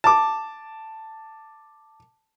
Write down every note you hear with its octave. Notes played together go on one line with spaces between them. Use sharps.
A5 D6